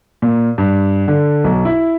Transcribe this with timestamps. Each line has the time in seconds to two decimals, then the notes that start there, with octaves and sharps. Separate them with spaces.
0.22 A#2
0.58 G2
1.08 D3
1.44 B1
1.65 E4